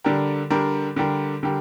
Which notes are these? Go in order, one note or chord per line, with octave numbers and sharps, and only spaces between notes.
D3 G3 D4 G4 A#4
D3 G3 D4 G4 A#4
D3 G3 D4 G4 A#4
D3 G3 D4 G4 A#4